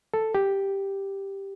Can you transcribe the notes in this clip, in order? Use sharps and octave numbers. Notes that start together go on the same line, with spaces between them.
A4
G4